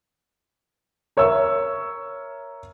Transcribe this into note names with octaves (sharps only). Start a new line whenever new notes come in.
A#4 C#5 E5 E6